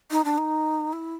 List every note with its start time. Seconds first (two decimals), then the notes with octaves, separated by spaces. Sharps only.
0.11 D#4
0.25 D4
0.38 D#4
0.93 E4